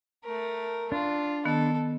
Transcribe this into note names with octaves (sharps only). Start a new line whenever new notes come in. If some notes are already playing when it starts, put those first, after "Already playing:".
A3 A#4
D4 F4
D#3 B3 A4